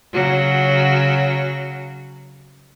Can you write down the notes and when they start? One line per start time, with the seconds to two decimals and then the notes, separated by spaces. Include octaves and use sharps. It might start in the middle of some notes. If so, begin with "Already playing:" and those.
0.13 C#3 F#3 F#4